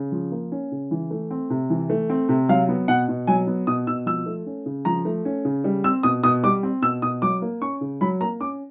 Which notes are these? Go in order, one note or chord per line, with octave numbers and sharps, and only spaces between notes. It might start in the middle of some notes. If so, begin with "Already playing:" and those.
Already playing: C#3
F3
A#3
C#4
C#3
E3
A3
C4
C3
E3
A3
C4
C3
F#3 F5
B3
B2 F#5
B2
F#3 G#5
B3
B2 D#6
B2 E6
F3 E6
A3
C#4
C#3
F3 A#5
A3
C#4
C#3
G3
C4 E6
B2 D#6
B2 D#6
G3 D6
C4
B2 E6
B2 D#6
F#3 D6
A#3
C#4 C#6
C#3
F#3 B5
A#3 A#5
C#4 D6